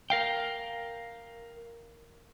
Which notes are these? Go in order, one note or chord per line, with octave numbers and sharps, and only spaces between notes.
A#4 F5 G5